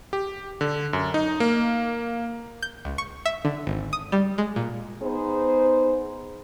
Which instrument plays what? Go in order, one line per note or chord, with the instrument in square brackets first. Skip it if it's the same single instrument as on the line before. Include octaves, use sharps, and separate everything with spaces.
[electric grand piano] G4
D3
F#2
D#4
A#3
[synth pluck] G6
C#2
C#6
E5
D3
G#1
D#6
G3
G#3
A#2
[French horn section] B3 D#4 G#4 C5